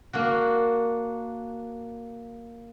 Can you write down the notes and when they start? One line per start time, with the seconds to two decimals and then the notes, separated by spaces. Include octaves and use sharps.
0.13 A#3 D4 F#4